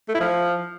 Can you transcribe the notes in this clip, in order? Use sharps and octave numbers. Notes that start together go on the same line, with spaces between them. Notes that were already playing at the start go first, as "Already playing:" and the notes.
A3
E4
F3